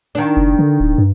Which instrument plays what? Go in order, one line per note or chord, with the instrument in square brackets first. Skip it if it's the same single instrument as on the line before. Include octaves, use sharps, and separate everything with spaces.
[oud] D#3 D4
[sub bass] F#1
D3
D1
G2